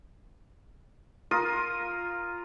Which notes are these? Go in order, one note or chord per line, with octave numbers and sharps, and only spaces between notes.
F4 A#4 D#6